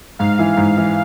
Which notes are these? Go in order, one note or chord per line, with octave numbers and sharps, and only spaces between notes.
G#2 F5
E3
G#2
E3